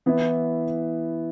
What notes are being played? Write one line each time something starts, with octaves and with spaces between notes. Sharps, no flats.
E3 B3 E4